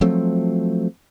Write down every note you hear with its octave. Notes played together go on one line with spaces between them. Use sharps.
F3 F#3 A3 C4